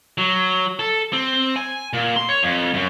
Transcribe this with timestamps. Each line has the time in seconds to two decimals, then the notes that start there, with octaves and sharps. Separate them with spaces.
0.18 F#3
0.79 A4
1.13 C4
1.56 G#5
1.93 A#2
2.16 C6
2.29 C#5
2.43 F2
2.74 F#2